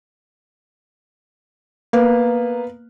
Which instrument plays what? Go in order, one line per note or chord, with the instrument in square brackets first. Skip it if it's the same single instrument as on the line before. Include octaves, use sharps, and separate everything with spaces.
[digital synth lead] A#3 [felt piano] B3 B4 F5